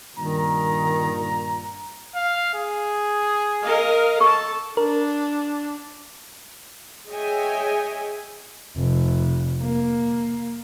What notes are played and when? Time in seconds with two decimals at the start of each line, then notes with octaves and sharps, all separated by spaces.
0.17 G2 A#2 D#3 A#5
2.15 F5
2.54 G#4
3.62 A#4 D#5 F5
4.20 A4 A5 C#6
4.77 D4 A#4
7.10 G#4 C#5 D#5 E5 G5 G#5
8.78 F1
9.63 A#3